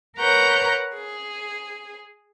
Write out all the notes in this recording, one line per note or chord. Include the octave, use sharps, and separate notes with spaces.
A#4 B4 C#5 F#5 A#5 G6
G#4